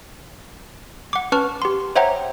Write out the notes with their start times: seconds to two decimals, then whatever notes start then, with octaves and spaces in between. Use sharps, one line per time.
1.13 F#5 D6
1.32 C#4 B4 A5 C#6 F6
1.62 G4 C6
1.96 C5 C#5 E5 F#5 G5 A#5